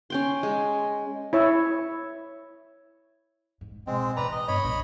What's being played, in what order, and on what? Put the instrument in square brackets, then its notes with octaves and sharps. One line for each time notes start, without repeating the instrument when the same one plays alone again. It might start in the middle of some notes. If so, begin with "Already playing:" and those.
[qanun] C#4 G5 C6
G#3
[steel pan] E4 C#5 E6
[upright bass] G#2
[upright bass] B1 [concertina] G#3 C4
[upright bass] A1 [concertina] B4 D5 A#5
[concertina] D#5
[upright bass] G2 B3 [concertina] C#5 D#5 B5
[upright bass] A#1 G2